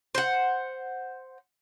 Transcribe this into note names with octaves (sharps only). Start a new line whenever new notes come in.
C5 F#5